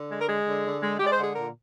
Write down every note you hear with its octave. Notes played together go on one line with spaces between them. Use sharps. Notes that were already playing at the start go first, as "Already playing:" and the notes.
Already playing: D3
G#3
A#4
G#3 G#4
D3
D3
G#3
G#3 G4
D5
C5
D3
G#4
A#2 A#4